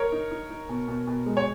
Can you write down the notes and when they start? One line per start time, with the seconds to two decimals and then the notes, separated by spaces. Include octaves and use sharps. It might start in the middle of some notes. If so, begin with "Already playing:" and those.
Already playing: A#4 C#5
0.12 D#4
0.31 D#4
0.50 D#4
0.69 B2
0.88 B2
1.07 B2
1.26 G#3
1.37 C#5